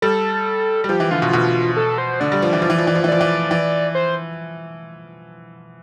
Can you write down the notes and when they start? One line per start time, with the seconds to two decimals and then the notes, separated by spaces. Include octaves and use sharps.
0.02 G3 A4
0.84 G3
0.89 F3 G4
1.00 E3
1.11 D3 F4
1.22 B2
1.33 B2
1.77 A4
1.98 C5
2.20 D3 D5
2.32 G3
2.42 F3
2.53 E3
2.62 F3
2.70 E3
2.78 F3
2.87 E3
2.95 F3
3.04 E3
3.08 F3 D5
3.21 E3
3.51 E3
3.95 C5